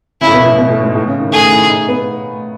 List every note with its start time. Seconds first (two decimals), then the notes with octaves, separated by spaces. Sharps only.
0.21 C#3 E4
0.27 A2
0.33 B2
0.46 A2
0.58 B2
0.70 A2
0.83 G#2
0.95 A2
1.07 C#3
1.20 D#3
1.32 A3 G#4
1.51 E4
1.69 D#4
1.88 B3